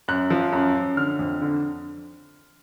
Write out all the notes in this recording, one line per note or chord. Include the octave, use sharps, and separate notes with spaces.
F#2 F#6
F3
F#2
F#2
D3 F6
F2
D3